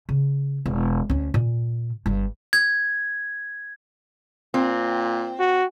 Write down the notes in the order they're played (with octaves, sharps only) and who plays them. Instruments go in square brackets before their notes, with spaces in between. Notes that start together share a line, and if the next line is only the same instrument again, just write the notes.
[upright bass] C#3
E1
D2 C#4
A#2
G1 G2
[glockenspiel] G#6
[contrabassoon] A#2 [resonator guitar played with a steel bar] C4
[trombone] F#4